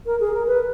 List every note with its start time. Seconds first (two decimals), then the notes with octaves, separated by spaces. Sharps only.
0.06 A#4
0.20 G#4
0.34 A#4
0.47 B4